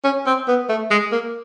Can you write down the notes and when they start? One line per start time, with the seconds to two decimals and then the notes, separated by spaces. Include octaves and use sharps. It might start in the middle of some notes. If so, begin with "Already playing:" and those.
0.04 C#4
0.27 C4
0.48 B3
0.69 A3
0.91 G#3
1.12 A#3